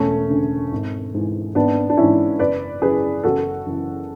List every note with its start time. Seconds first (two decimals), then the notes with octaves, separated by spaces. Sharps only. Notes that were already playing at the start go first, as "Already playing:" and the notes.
Already playing: E1 A3 C#4
0.30 D2 C#3
0.72 G#1
1.14 G#2 E3
1.55 G#1 B3 D4
1.90 D4
1.97 G#2 E3 C#4 E4
2.39 F#1 B4 D5
2.82 F#2 C#3 E3 G#4 B4
3.23 F#1 F#4 A4
3.66 F#2 C#3 E3